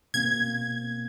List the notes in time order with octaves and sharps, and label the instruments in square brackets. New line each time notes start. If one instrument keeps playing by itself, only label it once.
[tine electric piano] B2 A#3 C4 [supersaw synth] G#6